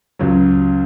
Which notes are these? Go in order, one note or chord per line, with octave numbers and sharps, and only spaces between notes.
C#2 C#3 F#3